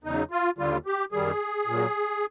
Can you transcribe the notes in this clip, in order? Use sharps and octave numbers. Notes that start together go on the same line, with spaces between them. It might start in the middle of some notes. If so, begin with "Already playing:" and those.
E2 C#3 F#3 D#4
F4
D#2 D3 G3 F4
G4
F#2 D#3 G3 G#4
A#2 F#3